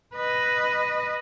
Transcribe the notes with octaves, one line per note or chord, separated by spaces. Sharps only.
B4 D#5